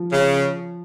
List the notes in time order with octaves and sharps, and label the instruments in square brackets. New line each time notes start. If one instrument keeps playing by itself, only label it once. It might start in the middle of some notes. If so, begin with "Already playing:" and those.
Already playing: [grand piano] F3
[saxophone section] C#3